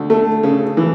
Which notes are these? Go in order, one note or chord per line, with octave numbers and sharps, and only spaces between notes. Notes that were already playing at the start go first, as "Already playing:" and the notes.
Already playing: D2
A3
C#3
E3